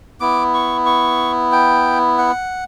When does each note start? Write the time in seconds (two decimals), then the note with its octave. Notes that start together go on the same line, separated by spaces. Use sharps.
0.20 B3 E4 D6
0.54 C#6
0.86 C#6
1.52 G5
2.18 F#5